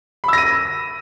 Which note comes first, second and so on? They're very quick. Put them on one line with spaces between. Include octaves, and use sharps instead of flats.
B5 E6 A#6 D#7